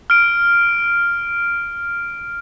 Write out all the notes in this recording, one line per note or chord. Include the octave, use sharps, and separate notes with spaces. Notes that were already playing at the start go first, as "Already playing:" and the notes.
F6 D7